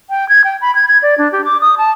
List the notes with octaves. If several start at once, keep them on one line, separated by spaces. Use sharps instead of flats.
G5
G#6
G5
B5
G#6
G#6
D5
D4
G4
D6
D#6
A5